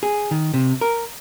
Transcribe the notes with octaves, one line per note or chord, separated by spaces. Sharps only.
G#4
D#3
C3
A#4